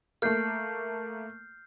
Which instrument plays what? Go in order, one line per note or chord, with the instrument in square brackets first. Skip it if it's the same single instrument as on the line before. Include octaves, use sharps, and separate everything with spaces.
[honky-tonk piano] A3 A#3 [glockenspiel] F6 G6 C7